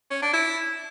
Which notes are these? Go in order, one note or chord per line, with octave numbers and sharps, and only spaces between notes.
C#4
D4
E4